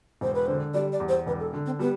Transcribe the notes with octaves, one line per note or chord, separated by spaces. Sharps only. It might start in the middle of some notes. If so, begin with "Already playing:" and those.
E1 C5
B4
D3 C5
G3 D5
D5
E2
C5
E1 B4
A4
D3
C4
G3 B3